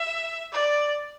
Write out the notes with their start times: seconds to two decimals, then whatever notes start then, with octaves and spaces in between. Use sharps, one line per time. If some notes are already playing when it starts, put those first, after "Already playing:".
Already playing: E5
0.53 D5